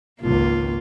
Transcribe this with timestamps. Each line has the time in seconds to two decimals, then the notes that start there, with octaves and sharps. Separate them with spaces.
0.22 G#1 C#2 A#3 F4